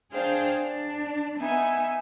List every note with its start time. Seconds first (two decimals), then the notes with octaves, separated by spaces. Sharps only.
0.11 D4 G#4 C5 F5 G5
0.59 D4
1.38 B3 D#4 E5 G#5